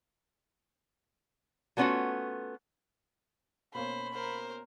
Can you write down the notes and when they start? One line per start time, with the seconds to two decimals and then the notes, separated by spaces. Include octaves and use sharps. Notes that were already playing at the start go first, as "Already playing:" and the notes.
1.77 F#3 A3 B3 C#4 F4 F#4
3.75 B2 A#3 C#4 C5 B5
4.14 A#4 C5